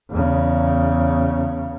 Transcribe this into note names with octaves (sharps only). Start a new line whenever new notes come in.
E2 C#3